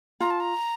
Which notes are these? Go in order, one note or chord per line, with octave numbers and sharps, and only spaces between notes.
F4 A#5
A5
A#5